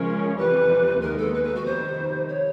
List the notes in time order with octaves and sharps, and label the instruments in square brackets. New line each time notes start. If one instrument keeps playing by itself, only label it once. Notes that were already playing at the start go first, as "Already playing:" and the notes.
Already playing: [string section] C#3 F3 G#3 C#4 [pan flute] A#4
[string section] F2 C3 E3 G3 [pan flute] B4
[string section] D#2 D#3 G#3 B3 [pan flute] A#4
[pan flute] A4
B4
B4
F#4
[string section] F2 C3 D#3 G3 [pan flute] C5
[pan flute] C#5